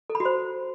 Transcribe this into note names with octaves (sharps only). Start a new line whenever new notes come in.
A4
B5
F#4
C5